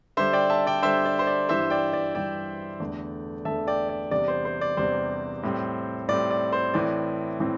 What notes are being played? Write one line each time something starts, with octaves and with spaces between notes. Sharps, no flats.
D3 G3 D4 C5 E5
D5 G5
E5 A5
D5 G5
D3 G3 D4 C5 E5
D5
C5
D5
G2 E3 G3 C5 E5
D5 G5
D5
G2 E3 G3 D5 G5
E2 D3 A3
E2 D3 A3 E5 A5
D5 G5
D5
E2 C3 G3 D4 D5
C5
C5
D5
E2 C3 G3 D4 C5
A2 G3 C4
A2 G3 C4 D5
D5
C5
A2 E3 C4 D5
A2 E3 C4